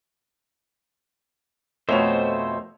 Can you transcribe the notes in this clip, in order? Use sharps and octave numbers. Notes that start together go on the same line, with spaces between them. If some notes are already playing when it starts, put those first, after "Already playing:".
F2 B2 A3 C5 C#5 D#5 E5 F7